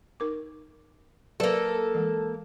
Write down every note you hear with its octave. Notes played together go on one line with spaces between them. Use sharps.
D#4 A#4 D6
F#3 A#3 A4 B4 D5
E3 G#3